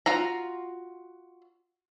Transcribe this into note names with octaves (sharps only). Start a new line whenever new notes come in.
F4 F#4 A#5